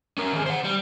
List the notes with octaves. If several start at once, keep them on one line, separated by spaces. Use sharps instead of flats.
C#4 A#4
D#3 G#4
C5 F#5
G3